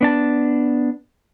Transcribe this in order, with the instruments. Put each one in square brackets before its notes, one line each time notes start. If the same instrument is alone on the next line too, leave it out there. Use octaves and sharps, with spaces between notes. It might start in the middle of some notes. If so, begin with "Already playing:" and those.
[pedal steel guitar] B3 D4 A5